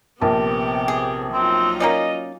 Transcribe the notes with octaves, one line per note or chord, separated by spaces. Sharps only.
A#1 C3 B3 G4 A#4 A5
G#4
F#3 C4 D#4 F4
A#3 C#4 D5 D#5